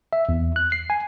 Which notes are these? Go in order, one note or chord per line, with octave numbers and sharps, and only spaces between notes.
E5
E2
F#6
C7
G#5